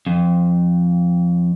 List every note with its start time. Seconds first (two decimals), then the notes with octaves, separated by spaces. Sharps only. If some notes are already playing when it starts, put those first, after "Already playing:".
0.07 F2